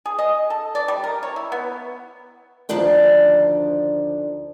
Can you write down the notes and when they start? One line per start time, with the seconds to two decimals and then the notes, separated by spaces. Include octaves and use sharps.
0.06 G#4
0.19 D#5
0.50 A4
0.75 D5
0.88 G3
1.04 A#4
1.23 C#5
1.36 E4
1.52 B3
2.69 D2 D#3 F3 D4 G5